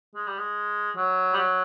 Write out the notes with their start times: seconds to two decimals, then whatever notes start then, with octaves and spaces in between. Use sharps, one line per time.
0.15 G#3
0.27 G3
0.38 G#3
0.96 F#3
1.33 G3
1.37 F#3